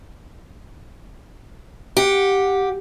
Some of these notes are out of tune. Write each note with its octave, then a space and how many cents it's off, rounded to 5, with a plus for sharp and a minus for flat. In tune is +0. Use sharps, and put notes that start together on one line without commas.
G4 +0 F#5 -10